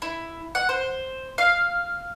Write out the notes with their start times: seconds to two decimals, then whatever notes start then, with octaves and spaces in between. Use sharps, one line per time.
0.02 E4
0.55 F#5
0.69 C5
1.38 F5